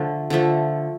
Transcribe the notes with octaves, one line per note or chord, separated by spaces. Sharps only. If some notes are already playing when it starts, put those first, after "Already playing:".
Already playing: D3 F3 A3
D3 F3 A3